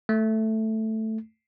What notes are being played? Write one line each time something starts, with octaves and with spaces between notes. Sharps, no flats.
A3